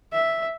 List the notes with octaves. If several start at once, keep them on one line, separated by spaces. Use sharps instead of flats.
E5